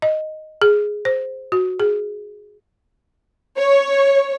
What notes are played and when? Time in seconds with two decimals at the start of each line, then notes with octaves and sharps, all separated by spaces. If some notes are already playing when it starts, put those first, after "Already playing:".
0.02 D#5
0.62 G#4
1.05 C5
1.52 F#4
1.80 G#4
3.57 C#5